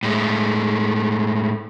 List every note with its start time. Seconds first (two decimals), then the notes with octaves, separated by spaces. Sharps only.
0.03 A2 G#3 A3